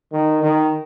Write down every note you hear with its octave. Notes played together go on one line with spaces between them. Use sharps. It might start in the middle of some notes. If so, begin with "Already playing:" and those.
D#3
D#3